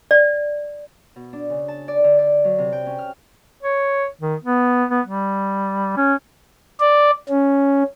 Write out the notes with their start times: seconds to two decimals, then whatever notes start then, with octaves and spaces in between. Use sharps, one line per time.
0.11 D5
1.16 B2
1.33 D4
1.50 C#3
1.68 A5
1.88 D5
2.04 D3
2.18 D5
2.44 F#3
2.58 C3
2.73 G5
2.86 C#4
2.98 F6
3.63 C#5
4.21 D#3
4.44 B3
4.90 B3
5.06 G3
5.97 C#4
6.80 D5
7.29 C#4